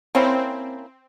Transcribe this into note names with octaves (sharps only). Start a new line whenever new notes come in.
A#3 C4 C#4 E4